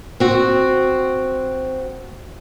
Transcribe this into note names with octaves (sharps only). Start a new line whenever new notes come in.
C4 F#4